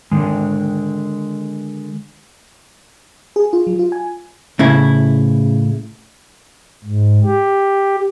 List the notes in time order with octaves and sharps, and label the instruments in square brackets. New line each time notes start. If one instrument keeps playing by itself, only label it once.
[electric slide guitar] D3 D#3 G#3
[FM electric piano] G#4
F4
F#3
F4
G#5
[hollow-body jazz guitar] A2 C#3 E4
[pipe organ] G#2
G4